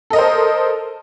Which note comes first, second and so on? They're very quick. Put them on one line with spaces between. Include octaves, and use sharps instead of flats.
A4 D#5 A#4 C5